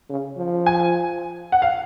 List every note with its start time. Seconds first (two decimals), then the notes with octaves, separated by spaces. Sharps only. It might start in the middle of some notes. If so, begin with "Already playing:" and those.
0.10 C#3
0.37 F3
0.66 G#5
1.52 F#5
1.62 F5